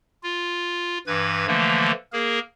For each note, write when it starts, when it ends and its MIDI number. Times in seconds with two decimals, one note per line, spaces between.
0.23 0.98 65
1.07 1.46 43
1.07 1.46 52
1.07 1.46 71
1.07 1.46 92
1.47 1.92 50
1.47 1.92 52
1.47 1.92 53
1.47 1.92 57
1.47 1.92 58
2.13 2.39 58
2.13 2.39 68
2.13 2.39 70